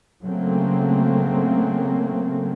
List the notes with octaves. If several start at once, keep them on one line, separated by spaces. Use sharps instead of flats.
C#3 F#3 A3 A#3 C4